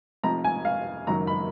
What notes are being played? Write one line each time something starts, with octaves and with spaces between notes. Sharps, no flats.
F1 F2 F3 A#5
G#5
F5
F#1 F#2 D#3 F#3 A#5
B5